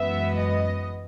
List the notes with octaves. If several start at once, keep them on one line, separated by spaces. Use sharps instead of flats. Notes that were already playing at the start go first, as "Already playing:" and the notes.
Already playing: F#2 E3 G#3 B3 E5
D#5